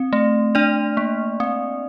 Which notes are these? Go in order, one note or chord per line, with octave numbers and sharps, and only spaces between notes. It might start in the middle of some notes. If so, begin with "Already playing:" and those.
Already playing: C4
A3
D4 D5
A#3
C4